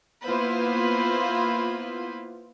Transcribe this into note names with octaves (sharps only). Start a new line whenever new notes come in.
A#3 B3 E4 F4 B4 C5